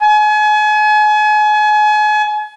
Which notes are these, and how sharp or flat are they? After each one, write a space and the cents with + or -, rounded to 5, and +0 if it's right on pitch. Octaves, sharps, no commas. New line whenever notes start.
G#5 +35